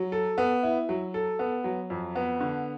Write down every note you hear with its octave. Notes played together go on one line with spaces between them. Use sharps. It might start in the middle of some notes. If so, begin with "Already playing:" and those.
Already playing: F#3
A4
B3
E4
F#3
A4
B3
F#3
F2
B3
D3